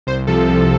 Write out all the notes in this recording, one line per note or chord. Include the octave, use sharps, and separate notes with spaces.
C2 C5
C3 F3 A4
C2